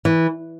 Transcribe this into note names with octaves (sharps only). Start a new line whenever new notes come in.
E3